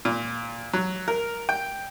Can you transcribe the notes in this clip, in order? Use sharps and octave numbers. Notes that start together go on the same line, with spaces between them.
A#2
F#3
A#4
G5